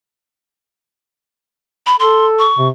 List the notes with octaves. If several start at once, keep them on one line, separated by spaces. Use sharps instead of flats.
B5
A4 C6
C#6
C3